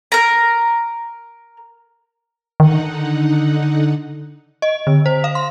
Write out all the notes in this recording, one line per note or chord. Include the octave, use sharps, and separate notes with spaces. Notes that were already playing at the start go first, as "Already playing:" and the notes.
A#4 A#5
D3 D#3 D#4 F#5
D#5
D3
C5
F5
C6